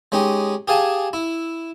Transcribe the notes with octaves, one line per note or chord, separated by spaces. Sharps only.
G#3 C#4 D#4 G4
G4 G#4 F5 G#5 A5
E4